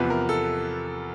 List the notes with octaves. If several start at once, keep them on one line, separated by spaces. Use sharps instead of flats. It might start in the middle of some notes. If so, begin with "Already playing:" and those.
Already playing: E2 C3 F3 B4
A#4
A4